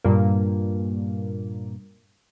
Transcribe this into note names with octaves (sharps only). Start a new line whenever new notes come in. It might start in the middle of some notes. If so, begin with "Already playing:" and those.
G2 A#2 A#3